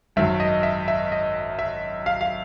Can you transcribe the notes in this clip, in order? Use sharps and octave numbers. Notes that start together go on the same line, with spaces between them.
G#1 F#2 D#3 F#3 E5
D#5
E5
E5
D#5
E5
F5
F5